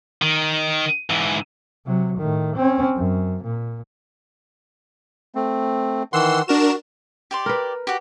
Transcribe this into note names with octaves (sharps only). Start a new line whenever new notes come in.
D#3
G#2 E3
C3 F#3
A2 D#3
C4 C#4
F#2
A#2
A3 C4
D#3 E3 F#5 C6 E6
D4 F#4 A#4 E7
G4 D5 C6
A#4 B4
F#4 G4